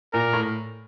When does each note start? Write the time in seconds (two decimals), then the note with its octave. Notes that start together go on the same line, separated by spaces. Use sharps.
0.13 A#2 A#4
0.33 A2